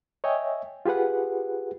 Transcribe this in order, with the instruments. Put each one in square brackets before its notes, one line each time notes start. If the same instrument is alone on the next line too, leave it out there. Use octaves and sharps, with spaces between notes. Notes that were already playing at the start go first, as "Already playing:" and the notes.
[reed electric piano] C#5 D#5 E5 G5 G#5
F4 G4 G#4 B4 F#5